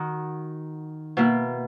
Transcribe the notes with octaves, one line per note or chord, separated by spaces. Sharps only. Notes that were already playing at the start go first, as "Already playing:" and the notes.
Already playing: D#3 D#4 F#4
B2 A#3 E4